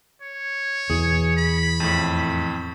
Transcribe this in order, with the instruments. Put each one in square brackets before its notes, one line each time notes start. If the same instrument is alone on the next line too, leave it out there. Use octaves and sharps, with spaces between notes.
[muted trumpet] C#5
[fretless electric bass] E2 B2 E3 [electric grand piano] G#4
[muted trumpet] B5
[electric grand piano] F2 A2